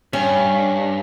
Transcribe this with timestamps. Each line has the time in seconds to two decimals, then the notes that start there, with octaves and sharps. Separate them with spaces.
0.13 G2 C#4